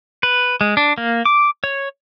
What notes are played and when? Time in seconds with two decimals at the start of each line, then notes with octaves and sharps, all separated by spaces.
0.23 B4
0.61 G#3
0.77 D4
0.98 A#3
1.25 D6
1.64 C#5